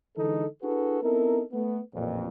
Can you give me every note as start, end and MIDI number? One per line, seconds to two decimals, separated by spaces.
0.16 0.44 50
0.16 0.44 52
0.16 0.44 56
0.16 0.44 63
0.16 0.44 69
0.63 1.01 62
0.63 1.01 64
0.63 1.01 66
0.63 1.01 68
0.63 1.01 69
0.63 1.01 71
1.03 1.42 59
1.03 1.42 60
1.03 1.42 63
1.03 1.42 64
1.03 1.42 69
1.03 1.42 70
1.52 1.78 57
1.52 1.78 59
1.94 2.28 33
1.94 2.28 41
1.94 2.28 46